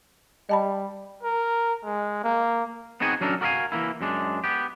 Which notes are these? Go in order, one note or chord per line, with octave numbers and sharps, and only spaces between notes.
G3 D#5 A5 B5
A#4
G#3
A#3
B3 C4 D#4 F#4 G#4 G#5
F#3 C#4 D4 A4 A#4
F#4 A#4 D5 E5 F5 G#5
E3 A#3 E4
F#2 G#3 D4
B3 G4